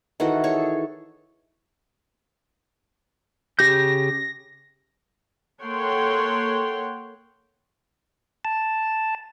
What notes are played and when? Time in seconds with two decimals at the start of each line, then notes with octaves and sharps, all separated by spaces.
0.20 D#3 E3 F#4 A4
0.44 G#4 A4 C#5 C#6
3.59 C#3 G4 G6 A#6
5.62 A#3 A4 C#5 F#5 G5 C6
8.45 A5